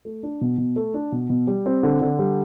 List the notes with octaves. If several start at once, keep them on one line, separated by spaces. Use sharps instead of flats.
A3
D4
B2
B2
A3
D4
B2
B2
G3
C4
D3
D3
G3